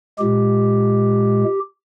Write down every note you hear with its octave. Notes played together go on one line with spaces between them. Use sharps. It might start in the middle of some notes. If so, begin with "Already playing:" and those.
A#2 G#3 G4